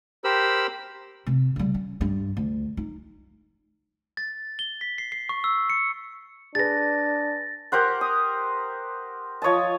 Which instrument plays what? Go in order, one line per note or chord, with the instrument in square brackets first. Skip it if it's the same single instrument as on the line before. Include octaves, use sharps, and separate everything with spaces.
[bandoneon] G4 A#4 C5 B5 E6
[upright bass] C3
C#3 G3
C#4
G2
D2
D#4
[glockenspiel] A6
G7
B6
C7
C7
C#6
E6
C#7
[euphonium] D4 [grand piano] G#4 B4 [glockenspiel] A6 A#6
[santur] G4 A#4 C5 F#5
D#6
F3 C#5 D#5 A5